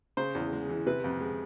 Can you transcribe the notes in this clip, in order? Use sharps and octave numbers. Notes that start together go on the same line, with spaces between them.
C#3 C5
E2
G#3
E3
C3 B4
F2
G#3